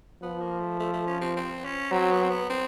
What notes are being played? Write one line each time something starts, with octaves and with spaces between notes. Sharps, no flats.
F3 B3
A#3
A3
A3
A3
C#4
C4
C4
C#4
F#3 C4
B3
C4
B3
C4